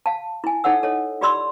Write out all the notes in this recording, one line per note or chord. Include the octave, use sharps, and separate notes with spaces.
F5 A5
E4 G#5
D#4 A4 C#5 F#5 E6
A4 C#5 D#5
F4 G4 D5 B5 C6 E6